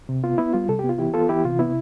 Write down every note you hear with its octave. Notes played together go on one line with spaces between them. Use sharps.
C3
B3 F4
B3 E4
G3 F4
C3 A4
G4
B3
F4
E3 E4 G4
B3 F4 A4
E3 E4 G4
C3 F4
B3 E4